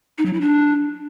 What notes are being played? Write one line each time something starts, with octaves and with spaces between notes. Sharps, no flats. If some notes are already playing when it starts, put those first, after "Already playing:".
D#4
F#3
E4
D4